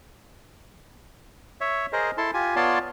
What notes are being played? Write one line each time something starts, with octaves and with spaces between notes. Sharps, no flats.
C#5 E5
G#4 A#4 C5 D#5
E4 A4 A5 C6
F4 G4 G#5
B3 F4 C#5 D5 A5 C6